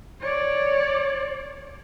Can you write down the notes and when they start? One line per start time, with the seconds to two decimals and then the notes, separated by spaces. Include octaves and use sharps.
0.21 C#5 D5